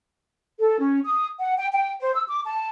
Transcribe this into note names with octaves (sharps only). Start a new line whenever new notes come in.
A4
C#4
D#6
F#5
G5
G5
C5
E6
D6
A5